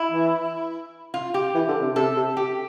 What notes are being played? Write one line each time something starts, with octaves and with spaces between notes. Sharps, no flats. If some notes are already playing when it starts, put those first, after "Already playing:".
Already playing: E4
E3
F4
G4
E3
D3
C3
C3 A4
C3
G4